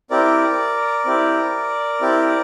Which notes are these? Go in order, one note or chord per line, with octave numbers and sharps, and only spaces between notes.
C4 E4 G4 A#4 D5
C4 E4 G4
C4 E4 G4